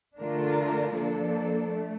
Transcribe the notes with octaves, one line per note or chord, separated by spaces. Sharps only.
D3 A3 D4 F4 A#4
F3 A#3 D4 A4
A3